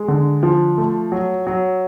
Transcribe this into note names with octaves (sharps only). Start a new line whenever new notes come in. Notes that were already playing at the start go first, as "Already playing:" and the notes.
Already playing: G#3
D3
F3
A3
F#3
F#3